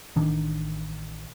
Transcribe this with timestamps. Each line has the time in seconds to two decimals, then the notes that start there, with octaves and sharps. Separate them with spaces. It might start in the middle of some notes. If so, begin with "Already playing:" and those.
0.16 A1 D#3 D4